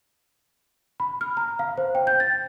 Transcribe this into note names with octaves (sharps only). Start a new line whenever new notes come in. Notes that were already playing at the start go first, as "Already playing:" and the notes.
B5
F6
A#5
F5
C5
G5
G6
A6